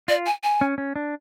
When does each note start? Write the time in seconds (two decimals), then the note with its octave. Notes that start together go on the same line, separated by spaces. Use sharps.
0.08 F4 D5
0.26 G#5
0.43 G#5
0.61 C#4
0.78 C#4
0.96 D4